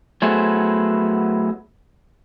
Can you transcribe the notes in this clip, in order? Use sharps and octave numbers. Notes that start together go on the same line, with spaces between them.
F#3 A3 B3 E4 G#4 C5